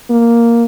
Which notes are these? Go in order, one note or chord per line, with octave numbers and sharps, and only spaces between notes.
A#3